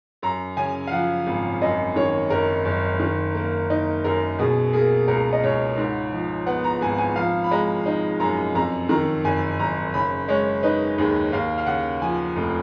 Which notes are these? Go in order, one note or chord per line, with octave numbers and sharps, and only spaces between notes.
F#2 A#5
C#3 G#5
F5
F3 F#5
G#1
F#2 D#5
D#3 C#5
F#1 A#4
F#1
D#3
A#3
D#4
F#2 A#4
B2 G#4
A#3 G#4
C#2 A#4
D#5
C#2 C#5
G#2
F3
B3 F#5
A#5
G#1 G#5
G#5
F3 F5
B5
G#3 A#5
D#4
F#2 A#5
F2 A#5
D#3 A#5
F#1 G#5
F#1 A#5
C#3 B5
G#3 C#5
D#4 B4
D#2 G#4
D#2 F5
F5
C#3 F#5
F3 G#5
F1